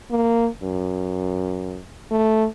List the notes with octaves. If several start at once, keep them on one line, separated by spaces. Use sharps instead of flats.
A#3
F#2
A3